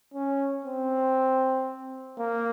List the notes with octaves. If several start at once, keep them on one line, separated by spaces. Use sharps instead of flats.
C#4
C4
A#3